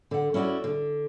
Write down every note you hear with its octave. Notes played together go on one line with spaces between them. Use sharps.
D3 F#5
C#4 E4 F#4 D5
D3